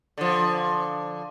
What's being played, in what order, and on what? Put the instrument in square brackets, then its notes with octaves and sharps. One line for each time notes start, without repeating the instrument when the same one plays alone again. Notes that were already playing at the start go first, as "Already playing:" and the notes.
[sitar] D3 F3